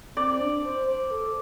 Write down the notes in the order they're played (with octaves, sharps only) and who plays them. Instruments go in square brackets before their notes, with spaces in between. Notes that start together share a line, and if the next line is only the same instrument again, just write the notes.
[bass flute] C4 [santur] D5
[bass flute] D4
C5
C5
A4